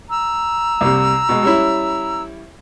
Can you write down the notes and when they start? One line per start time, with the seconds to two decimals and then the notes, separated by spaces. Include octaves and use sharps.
0.10 A#5 E6
0.81 C2 C3
1.29 B2 G#3
1.43 G3 C#4 E4